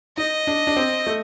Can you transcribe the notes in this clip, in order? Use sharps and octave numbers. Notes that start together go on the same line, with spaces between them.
D#4 D#5
D4
D4
C4
A3